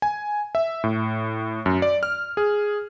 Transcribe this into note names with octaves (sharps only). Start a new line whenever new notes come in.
G#5
E5
A2
F#2
D5
F6
G#4